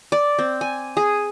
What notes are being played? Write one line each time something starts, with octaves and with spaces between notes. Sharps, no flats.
D5
C4
G#5
G#4